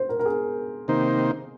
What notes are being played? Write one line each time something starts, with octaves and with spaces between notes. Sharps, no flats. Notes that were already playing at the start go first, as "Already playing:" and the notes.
Already playing: C5
A#4
A#4
G#4
C3 D#3 A#3 D#4 C5